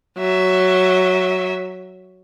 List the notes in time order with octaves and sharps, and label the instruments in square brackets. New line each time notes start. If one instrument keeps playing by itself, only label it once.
[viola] F#3 E5